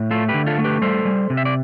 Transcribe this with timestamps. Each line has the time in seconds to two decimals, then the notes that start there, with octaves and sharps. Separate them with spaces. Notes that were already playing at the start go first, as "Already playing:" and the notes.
Already playing: A2
0.11 A3 F4 A4
0.28 G4 B4
0.34 D3
0.46 F4 A4
0.58 A3
0.64 G4 B4
0.82 G3 A4 C5
1.05 G3
1.30 C3
1.37 E5
1.45 D5